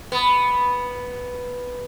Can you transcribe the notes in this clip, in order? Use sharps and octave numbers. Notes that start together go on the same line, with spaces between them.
B3